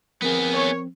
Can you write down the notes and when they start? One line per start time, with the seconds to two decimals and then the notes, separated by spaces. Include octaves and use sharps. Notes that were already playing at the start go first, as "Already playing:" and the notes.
0.22 F3 B3 C4 G#4 A#4
0.54 C#5